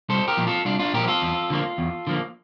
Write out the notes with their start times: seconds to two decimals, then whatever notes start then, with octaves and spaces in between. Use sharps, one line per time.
0.09 C2 A4 C5
0.28 G4 A#4
0.37 A#2 F3
0.47 F4 A4
0.65 C2 D4 F4
0.79 D4 F4
0.94 A#2 F3 G4 A#4
1.08 F4 A4
1.22 E2
1.50 D3 F3 A#3
1.78 E2
2.07 D3 F3 A#3